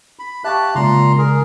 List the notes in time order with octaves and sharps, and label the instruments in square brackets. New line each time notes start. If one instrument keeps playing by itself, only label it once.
[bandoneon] B5
[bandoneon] G4 A5 F#6 [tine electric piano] E5 F5 C#6
[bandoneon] A#2 A#5 C6 [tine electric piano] C#3 G#3
[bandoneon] G#4 A#4